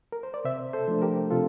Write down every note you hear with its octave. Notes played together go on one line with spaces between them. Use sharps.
A#4
C5
D5
C3 C5 E5
A4 C5
F3 A3 D4
G4 A#4
C3 F4 A4